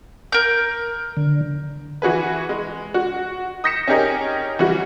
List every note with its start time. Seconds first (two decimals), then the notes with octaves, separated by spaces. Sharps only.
0.32 A#4 G6
1.17 D3
2.02 E3 F#4 G#4 B4
2.49 G#3
2.94 F#4
3.64 D#6 G6 A#6 B6 C#7 E7
3.87 C#4 D#4 G4 G#4 A#4 D#5
4.59 E3 G3 F#4